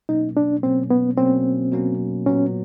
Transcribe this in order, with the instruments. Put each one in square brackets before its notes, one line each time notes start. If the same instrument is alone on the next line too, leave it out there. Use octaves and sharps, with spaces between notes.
[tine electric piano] B2 F#3 A#3 C#4 [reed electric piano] D#4
[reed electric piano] D4
[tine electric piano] B2 F#3 A#3 C#4 [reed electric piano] C4
[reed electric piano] B3
[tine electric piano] B2 F#3 A#3 C#4 [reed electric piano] C4
[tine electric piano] B2 F#3 A#3 C#4
[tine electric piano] A#2 F#3 B3 [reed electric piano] C#4